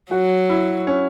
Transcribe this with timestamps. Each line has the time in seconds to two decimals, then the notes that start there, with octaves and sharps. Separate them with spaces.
0.11 F#3 F#4
0.49 E4
0.87 C#4